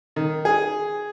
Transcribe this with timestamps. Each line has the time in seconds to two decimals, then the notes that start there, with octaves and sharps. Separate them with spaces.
0.16 D#3
0.45 G#4